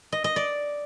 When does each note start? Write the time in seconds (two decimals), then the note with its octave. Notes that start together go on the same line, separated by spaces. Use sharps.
0.12 D#5
0.24 D#5
0.36 D5